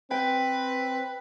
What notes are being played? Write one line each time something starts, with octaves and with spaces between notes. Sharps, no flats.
C4 B4 G5